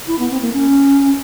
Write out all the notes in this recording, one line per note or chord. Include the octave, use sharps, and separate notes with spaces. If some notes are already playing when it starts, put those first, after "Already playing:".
E4
B3
C4
A#3
C#4